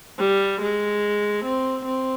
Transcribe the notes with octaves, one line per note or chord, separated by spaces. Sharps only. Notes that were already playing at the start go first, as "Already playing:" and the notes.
G3
G#3
C4
C4